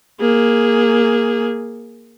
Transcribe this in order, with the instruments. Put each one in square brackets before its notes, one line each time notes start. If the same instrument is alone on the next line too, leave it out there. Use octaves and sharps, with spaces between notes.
[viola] A#3 G#4